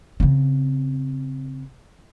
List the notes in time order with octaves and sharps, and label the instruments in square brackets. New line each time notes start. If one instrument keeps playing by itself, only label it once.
[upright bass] C#3 C4